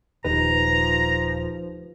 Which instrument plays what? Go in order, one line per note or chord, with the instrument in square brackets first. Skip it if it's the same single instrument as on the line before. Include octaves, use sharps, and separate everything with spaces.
[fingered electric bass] D#1 [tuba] F3 [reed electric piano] D#4 G4 B4 [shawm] A#5